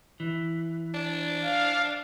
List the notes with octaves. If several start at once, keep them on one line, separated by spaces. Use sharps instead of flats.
E3
D4
F5